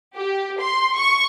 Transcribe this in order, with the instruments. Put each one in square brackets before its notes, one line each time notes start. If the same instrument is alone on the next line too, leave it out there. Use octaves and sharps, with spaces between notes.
[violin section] G4
C6
C#6